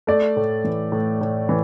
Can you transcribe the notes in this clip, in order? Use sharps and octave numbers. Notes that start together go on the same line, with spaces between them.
A3 D5
A2
E3
A2
A2
E3